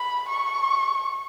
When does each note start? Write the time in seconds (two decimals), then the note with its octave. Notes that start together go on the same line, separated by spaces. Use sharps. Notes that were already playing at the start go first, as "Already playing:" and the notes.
Already playing: B5
0.28 C#6